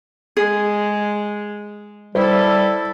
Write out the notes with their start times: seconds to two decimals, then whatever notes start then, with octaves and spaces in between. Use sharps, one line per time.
0.37 G#3 G#4
2.15 G3 E4 A4 C5